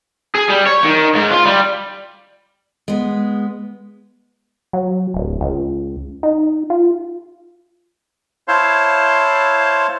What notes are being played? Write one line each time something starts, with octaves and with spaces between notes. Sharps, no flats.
G#4
G3
C#5
D#3
G#2
F4
G3
G#3 B3
F#3
D1
C#2
D#4
F4
E4 C5 C#5 F5 A5 C6